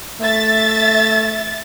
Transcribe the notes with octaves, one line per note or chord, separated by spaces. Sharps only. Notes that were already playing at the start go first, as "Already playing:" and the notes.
A3 E5 A6